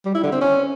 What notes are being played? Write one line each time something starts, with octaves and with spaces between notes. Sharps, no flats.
G3
E4
D3
C4
C#4